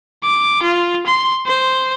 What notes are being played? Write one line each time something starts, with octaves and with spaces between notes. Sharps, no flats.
D6
F4
C6
C5